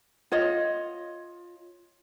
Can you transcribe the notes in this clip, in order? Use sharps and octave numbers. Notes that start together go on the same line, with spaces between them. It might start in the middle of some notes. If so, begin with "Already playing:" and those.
F4 C#5 D#5